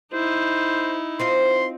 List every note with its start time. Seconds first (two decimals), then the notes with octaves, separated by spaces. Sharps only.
0.13 D#4 E4 C5
1.20 C4 D#4 F4 C6